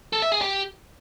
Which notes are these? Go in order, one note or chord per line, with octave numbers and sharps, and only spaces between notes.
A4
E5
G#4
G4